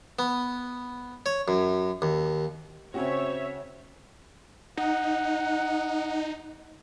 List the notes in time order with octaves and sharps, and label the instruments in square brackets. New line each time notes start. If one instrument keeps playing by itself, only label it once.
[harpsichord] B3
C#5
F#2
D#2
[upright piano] C#3 C#4 F#4 [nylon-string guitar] C4 [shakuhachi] C5 [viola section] C#5 E5
[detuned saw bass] D#4 [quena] F#5